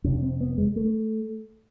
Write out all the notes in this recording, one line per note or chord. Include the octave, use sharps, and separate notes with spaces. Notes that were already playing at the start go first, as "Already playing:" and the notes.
F2 C3 C#4
C4
B3
G#3
A3